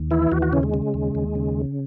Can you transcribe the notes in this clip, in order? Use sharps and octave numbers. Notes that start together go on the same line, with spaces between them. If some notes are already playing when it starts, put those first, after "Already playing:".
Already playing: D#2
E3 E4
D#2 F#4
F#4
C#3 C#4
G#3
C#3
D#2
D#2
C#3